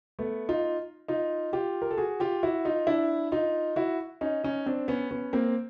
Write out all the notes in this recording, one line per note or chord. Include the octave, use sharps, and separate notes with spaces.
A3 B3
D#4 F4
D#4 F4
F4 G4
A#4
A4
F#4 G#4
F4 G4
E4 F#4
D#4 F4
D4 E4
D#4 F4
E4 F#4
C#4 D#4
C#4 D#4
C4 D4
B3 C#4
B3 C#4
A#3 C4